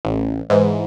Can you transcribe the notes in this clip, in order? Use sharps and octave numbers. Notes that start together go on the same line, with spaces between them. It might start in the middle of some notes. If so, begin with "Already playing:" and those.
A1
G#2 E3